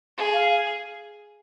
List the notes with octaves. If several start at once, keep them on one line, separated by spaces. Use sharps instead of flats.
G#4
F5